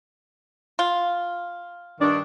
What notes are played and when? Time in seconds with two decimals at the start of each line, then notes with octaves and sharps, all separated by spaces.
0.79 F4
2.01 G2 D#3 D4